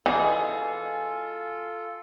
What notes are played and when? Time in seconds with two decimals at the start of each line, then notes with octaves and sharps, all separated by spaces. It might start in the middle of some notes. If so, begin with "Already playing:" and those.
0.06 B2 E3 G#3 F4 G#4 A4 G#5